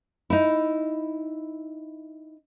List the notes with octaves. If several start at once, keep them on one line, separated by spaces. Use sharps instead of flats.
D#4 E4